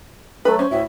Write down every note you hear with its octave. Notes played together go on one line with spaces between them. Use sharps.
F#3 A3 A4 B4
C#4 C5
D2 A2 E5